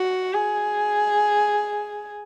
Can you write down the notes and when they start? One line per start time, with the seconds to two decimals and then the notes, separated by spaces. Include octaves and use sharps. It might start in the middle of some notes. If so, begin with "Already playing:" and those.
Already playing: F#4
0.33 G#4